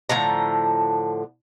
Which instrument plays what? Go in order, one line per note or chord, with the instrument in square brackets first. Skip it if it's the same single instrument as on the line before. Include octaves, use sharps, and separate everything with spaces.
[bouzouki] A2 D3 F3 A#5